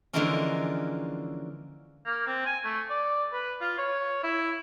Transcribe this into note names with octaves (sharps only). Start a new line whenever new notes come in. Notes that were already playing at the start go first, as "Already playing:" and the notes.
D3 E3 F3 G#3 A#3 C#4
A#3
C4
G#5
A3
D5
B4
F4
C#5
E4